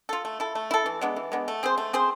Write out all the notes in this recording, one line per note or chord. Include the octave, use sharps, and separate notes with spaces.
F4 A4
A3
E4 A4
A3
E4 A4
E3
G#3 B3 D4
E3
G#3 B3 D4
A3
C4 G#4 C5
A3
C4 G#4 C5